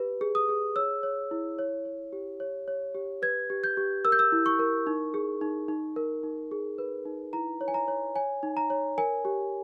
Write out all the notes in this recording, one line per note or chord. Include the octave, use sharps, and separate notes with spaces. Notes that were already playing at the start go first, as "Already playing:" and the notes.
Already playing: G4 B4
G#4
D#6
G#4
C#5 E6
C#5
E4
C#5
C#5
G4
C#5
C#5
G4
B4 G#6
G4
G6
G4
A#4 E6
G6
E6
E4
C#6
A#4
D#4
G#4
D#4
D#4
A#4
D#4
G#4
B4
D#4
E4 A#5
C#5
G#5
A#5
C#5
C#5 G#5
D#4
A#5
C#5
A#4 G#5
G4